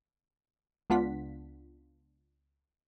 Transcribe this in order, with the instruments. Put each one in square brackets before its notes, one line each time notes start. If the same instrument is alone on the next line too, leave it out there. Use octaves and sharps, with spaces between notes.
[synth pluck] C#2 B3 D4 F4 F#5 B6